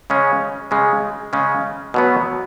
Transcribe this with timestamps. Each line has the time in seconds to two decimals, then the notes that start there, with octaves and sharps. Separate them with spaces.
0.10 C#3 G#3 C#4
0.71 C#3 G#3 C#4
1.33 C#3 G#3 C#4
1.94 B2 F#3 B3